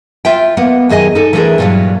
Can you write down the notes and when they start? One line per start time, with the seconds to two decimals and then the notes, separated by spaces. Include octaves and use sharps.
0.25 F4 E5 G5
0.57 A#3 B3 F#5
0.89 F#2 D#3 G#4 D#5 G#5
1.15 D#4 A4
1.33 E3 A3 D4 E4 G#4 A#4
1.58 G2 A#2 F#3